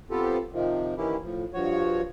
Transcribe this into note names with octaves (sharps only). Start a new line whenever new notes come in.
B3 C4 F4 G4 A4
C3 D#3 F3
D#3 E3 A#3 C#4 E4 G4
A2 F3
G2 F3 F#4 C#5